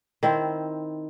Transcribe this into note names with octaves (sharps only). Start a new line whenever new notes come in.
D#3 C4 E4 C5